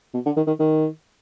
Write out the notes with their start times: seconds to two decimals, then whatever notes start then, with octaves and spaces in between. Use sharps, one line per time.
0.14 B2
0.26 D3
0.37 D#3
0.47 D#3
0.60 D#3